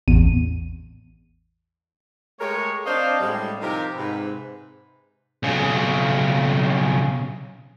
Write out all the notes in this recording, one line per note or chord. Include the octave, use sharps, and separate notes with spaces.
A1 E2 D#7
G#3 A3 G4 A#4 C#5
C4 D4 C5 D#5 F5
A2 G3 G#3
C3 D#3 F3 D#4 G4 A#4
G#2 C3 B4
B1 C#3